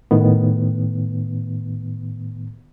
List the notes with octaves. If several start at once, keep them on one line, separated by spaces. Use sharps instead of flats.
A2 D#3 B3